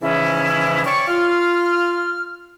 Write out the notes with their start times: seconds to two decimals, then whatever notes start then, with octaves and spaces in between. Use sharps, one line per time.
0.02 G#2 C#3 E3 F3 C#4 E4
0.85 C#5 D5 G5 C#6
1.08 F4 F6